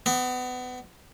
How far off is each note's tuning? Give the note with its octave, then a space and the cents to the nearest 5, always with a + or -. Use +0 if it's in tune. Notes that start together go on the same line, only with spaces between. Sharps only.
B3 +25 D5 +45